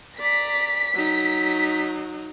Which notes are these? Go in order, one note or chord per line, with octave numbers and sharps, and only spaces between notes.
D5 A#5 B6
F#3 D#4